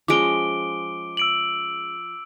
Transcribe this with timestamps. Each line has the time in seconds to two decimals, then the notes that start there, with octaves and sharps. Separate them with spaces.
0.08 F3 G#3 C#4 D6 D7 G7
1.17 E6 D7 F#7